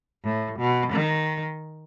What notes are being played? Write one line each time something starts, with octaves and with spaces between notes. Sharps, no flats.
A2
B2
D#3